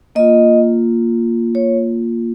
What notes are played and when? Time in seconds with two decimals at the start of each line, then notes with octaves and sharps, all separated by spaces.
0.15 A#3 F4 D#5
1.55 C#5